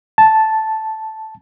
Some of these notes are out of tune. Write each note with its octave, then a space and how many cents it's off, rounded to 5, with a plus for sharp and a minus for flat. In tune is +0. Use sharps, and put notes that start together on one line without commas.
A5 -5